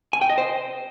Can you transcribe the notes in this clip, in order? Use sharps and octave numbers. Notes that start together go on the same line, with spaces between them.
G#5
G5
D#5
C5